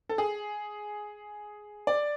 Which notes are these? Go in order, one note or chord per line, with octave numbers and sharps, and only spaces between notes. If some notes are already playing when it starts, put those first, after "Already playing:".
A4
G#4
D5